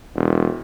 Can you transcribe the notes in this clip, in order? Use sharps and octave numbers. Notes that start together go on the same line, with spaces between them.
E1